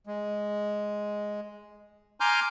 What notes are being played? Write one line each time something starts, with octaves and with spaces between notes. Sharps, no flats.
G#3
G#5 A#5 C6 D6 F6 G6